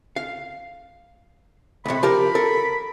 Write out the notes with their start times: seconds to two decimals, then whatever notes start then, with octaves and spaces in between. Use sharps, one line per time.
0.16 F5
1.86 C#2 C3 B5
2.03 F3 G4 A#4
2.35 A4 A#4